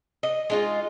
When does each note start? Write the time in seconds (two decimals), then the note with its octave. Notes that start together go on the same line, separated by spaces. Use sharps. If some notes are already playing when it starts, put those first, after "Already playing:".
0.23 D#5
0.50 G#3 D#4 F4